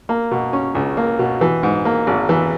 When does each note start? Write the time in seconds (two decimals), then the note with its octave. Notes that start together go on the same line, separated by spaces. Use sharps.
0.09 A#3
0.31 B2
0.53 C#4
0.75 C#2
0.97 A#3
1.19 B2
1.41 E3
1.63 G#2
1.85 A#3
2.07 G#1
2.29 E3